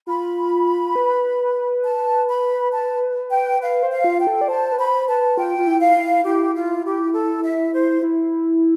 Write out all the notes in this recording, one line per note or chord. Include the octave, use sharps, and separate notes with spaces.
F4 B5
B4
A5
B5
A5
G5
B4 F5
C5
F5
F4
G5
A4
D5
C5 A5
B4
C5 B5
B4 A5
F4 G5
F4
E4
F5
E4
E4 G4
F4
G4
A4
E5
C5
E4